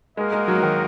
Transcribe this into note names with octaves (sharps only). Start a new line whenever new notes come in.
G#3 A#3 F#4 A#4 D#5 F#5
G#3
F#3
F#3
D#3